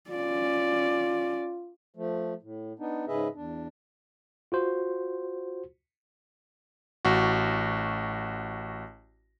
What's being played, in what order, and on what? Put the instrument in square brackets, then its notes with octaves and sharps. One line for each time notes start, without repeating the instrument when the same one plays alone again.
[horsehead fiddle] C#4 D5 [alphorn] F4
[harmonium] F3 A3
A2
B3 D4 D#4
G#2 C#3 G#4 B4 D#5 E5
E2 D4
[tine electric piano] F4 F#4 C5
[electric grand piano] A1 F#4